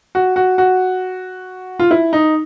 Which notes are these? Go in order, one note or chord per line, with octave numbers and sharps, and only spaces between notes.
F#4
F#4
F#4
F4
E4
D#4